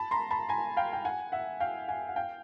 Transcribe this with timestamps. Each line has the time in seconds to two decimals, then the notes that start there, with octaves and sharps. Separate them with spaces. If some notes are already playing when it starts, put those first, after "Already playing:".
Already playing: A5 B5
0.11 A#5 C6
0.31 A5 B5
0.49 G#5 A#5
0.77 F5 G5
0.93 G5
1.05 F#5 G#5
1.32 E5 F#5
1.60 F5 G5
1.88 F#5 G#5
2.08 F#5
2.16 F5 G5